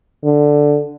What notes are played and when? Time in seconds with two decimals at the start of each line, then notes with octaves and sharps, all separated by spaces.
0.24 D3